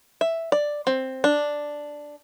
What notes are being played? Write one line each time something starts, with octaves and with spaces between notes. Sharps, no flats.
E5
D5
C4
D4